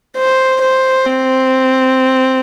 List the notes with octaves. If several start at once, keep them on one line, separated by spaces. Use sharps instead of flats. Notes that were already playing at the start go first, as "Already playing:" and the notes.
C5
C5
C4